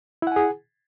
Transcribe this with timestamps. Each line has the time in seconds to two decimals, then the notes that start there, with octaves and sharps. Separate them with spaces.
0.22 E4
0.27 F#5
0.32 G#5
0.36 G#4